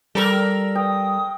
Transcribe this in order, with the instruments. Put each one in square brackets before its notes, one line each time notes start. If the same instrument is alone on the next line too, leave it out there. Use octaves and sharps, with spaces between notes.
[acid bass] G3 [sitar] A4 A#4
[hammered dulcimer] G5 [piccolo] D#6